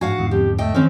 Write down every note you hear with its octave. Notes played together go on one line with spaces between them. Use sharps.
G#2 D4 F#4 F5 F#5 G#5
E2 G#2 D3
F2 G4
A3 D#5 G5
D#3 C4 C#4